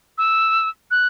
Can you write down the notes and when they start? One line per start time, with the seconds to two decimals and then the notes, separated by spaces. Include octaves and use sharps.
0.18 E6
0.91 F#6